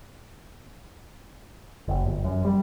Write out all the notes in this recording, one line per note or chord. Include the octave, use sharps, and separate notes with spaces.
F#1
G1
F#2
G3